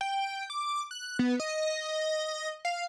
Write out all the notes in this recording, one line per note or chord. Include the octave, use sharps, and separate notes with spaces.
G5
D6
F#6
B3
D#5
F5